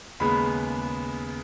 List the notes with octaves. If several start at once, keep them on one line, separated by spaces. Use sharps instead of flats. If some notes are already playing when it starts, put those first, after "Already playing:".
D#2 C#3 G#3 B3 B5